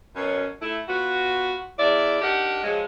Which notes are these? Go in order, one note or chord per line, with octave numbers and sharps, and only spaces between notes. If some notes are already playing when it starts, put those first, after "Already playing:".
F#2 B2 C#4
A3 E4
B3 F4 F#4
E2 E4 D5
D4 D#4 G4 A#4 F#5
F3 F#3 G#3